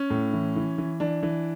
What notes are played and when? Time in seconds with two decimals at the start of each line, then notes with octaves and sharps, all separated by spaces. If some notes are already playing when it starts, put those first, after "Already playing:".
Already playing: C#4
0.10 A2
0.33 E3
0.56 E3
0.78 E3
1.00 E3 D4
1.23 E3